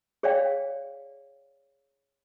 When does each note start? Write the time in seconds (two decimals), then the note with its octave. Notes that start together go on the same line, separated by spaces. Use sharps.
0.23 G#4 C#5 D5 F5 G5